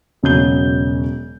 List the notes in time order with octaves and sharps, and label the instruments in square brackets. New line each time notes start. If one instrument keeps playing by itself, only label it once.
[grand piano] E1 C#3 F#3 G6 G7